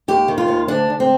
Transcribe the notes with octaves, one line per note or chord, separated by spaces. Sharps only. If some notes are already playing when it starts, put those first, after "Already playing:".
D#2 G4
D#3
F4
D#2
D2 D4
D2
C4